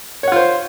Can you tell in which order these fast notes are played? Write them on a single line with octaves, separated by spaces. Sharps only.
C#5 F#5 F4 C5